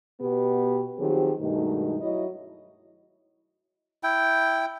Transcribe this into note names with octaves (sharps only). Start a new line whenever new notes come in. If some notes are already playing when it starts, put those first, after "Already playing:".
B2 B3 G4
D#3 F3 F#3 C4 G4 G#4
G2 B2 D#3 G#3 A3 D#4
F#3 E4 D#5
E4 G5